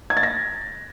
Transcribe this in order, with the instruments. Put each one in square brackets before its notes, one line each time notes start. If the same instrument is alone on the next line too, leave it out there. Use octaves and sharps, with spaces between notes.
[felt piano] G#6
A6
A#6